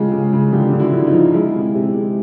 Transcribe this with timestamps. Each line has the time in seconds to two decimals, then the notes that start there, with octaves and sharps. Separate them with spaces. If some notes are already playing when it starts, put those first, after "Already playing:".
Already playing: C#3 G#3 F4 G4
0.12 C#3
0.33 C#3
0.53 D3 F4 G4
0.73 D3
0.79 E4 F#4
0.93 D3
1.07 D#4 F4
1.13 F3
1.34 G#3 E4
1.54 C3
1.75 C3
1.95 G#3